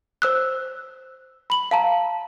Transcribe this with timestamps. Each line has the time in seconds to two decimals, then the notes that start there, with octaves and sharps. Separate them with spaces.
0.22 C5 E6 F#6
1.50 B5 F#7
1.71 F5 A5 A#5